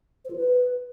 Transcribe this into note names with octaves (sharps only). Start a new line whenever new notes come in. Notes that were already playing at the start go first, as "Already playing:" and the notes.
C5
F4
B4